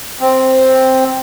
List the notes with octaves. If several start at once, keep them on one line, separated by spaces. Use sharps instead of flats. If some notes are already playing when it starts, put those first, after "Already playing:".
C4